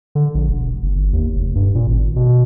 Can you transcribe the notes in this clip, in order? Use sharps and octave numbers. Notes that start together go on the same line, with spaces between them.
D3
A#1
E1
F#1
G1
D#2
F1
G2
A#2
G#1
B2